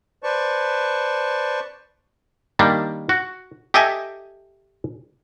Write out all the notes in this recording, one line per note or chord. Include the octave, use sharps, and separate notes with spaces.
B4 C5 D5 A5 C#6
D#3 G3 A#3 D4
F#4
G4 A4 D#5 E5 G#5